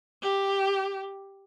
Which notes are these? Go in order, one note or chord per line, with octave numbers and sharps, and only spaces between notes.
G4